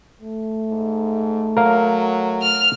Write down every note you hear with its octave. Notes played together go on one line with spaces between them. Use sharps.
A3
G#2
F#3 A#4 F5
F6